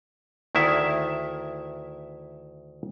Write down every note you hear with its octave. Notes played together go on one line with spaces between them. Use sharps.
D2 D#3 E4 E5